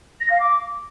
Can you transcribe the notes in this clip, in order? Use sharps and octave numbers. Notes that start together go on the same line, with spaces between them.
A#6
F5
D6